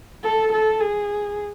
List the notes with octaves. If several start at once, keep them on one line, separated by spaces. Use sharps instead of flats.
A4
A4
G#4